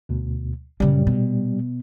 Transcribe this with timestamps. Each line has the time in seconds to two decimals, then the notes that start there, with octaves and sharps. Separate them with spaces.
0.09 D2 B2
0.80 F#2 A#2 C#3 G3
1.07 B2